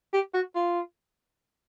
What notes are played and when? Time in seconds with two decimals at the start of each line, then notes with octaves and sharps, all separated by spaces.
0.13 G4
0.34 F#4
0.55 F4